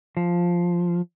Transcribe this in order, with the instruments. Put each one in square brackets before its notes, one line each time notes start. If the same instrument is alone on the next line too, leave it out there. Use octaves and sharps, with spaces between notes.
[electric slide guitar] F3